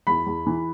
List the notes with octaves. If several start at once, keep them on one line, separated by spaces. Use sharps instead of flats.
E2 B5
E2
E3